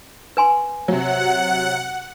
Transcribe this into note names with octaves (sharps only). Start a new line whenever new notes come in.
B4 G#5 C6
C3 F#3 F#5